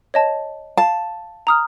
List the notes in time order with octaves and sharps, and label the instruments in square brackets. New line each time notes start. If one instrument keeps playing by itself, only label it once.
[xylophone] C#5 D#5 A5
[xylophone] F5 [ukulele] A5
[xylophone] A#5 D#6 F6